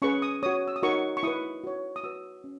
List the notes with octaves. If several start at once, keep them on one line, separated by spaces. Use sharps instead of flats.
C#4 G#4 B4 C#6
D#6
F#4 C#5 D#6
E6
D#6
D#4 F#4 A#4 C#5 C#6
C#6
E4 B4 D#6
F#4 C#5
D#6
F#4 B4 E6
C#4